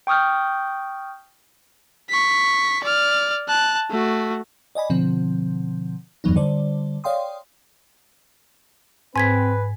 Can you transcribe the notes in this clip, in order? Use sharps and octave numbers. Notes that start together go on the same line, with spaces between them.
G5 C#6 D#6 F6 G6
C#6 B6
D5 F6
A5 F#6
A3 F#4
D5 D#5 G#5 B5
B2 D3 F3 C4
E2 G2 E3 F#3 B3 D#4
D3 G3 C5 D5
C#5 D5 F5 G5 C6 D#6
G#2 C4 B4 G#5 G#6 B6